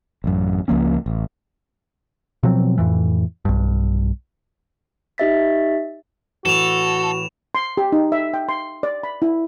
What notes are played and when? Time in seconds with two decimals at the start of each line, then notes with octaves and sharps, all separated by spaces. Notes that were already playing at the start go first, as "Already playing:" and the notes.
0.24 A1 F#2
0.68 C#2 F3 A#3 C#4
1.06 A1
2.43 B2 F3 F#3 C4
2.78 F2 A2 E3
3.45 B1 G2
5.18 D#4 G4 D#5 E5 A6 B6
6.45 A2 E3 F#4 A4 E7 F7
7.55 C6
7.77 G4
7.92 D#4
8.12 E5
8.34 G5
8.49 C6
8.83 D5
9.03 B5
9.22 E4